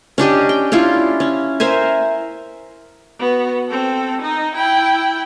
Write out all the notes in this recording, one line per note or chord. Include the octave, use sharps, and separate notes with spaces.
C#4 D4 G4 D#5
G5
C#4 D4 E4 F4
C#4
A#4 C5 E5 G#5
B3 F#4
C4 A4
D#4 D#5
E4 G5